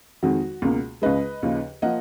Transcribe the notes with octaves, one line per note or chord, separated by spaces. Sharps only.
F2 D#3 G#3 F#4
C#2 B2 A#3
C#2 C#3 G#3 B4 D#5
D#2 C#3 F3
F3 A#3 D#5 F#5